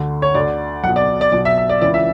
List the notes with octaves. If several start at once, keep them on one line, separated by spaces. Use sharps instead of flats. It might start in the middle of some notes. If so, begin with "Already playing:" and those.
Already playing: D2 D3
C#5
D2 D3 D5
B1 F#5
B2
D5
D5
B1 B2 D5
E5
E5
D5
C#2 C#3 E3 D5
E5